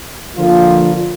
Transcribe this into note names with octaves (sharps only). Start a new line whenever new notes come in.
D3 F3 A#3 F4